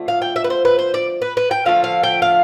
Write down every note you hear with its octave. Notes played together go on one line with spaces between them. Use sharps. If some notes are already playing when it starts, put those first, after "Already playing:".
Already playing: D3 F3 A3
F5
G5
E5
B4
C5
B4
C5
D5
B4
B4
G5
D3 F3 A3 F5
F5
G5
F5